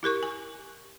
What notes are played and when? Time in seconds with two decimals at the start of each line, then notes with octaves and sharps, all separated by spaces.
0.03 E4 G4 A#4 C#6
0.23 G#5